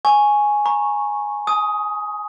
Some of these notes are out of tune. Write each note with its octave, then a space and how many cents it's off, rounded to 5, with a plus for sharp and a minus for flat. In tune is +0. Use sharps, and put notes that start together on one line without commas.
G#5 +0 C#6 +0
A#5 +0 C#6 -10
G#5 +40 D#6 +10